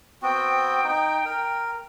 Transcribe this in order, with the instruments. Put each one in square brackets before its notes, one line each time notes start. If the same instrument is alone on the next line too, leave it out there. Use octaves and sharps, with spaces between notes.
[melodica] B3 C4 F#4 [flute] G5
[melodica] D#4
A#4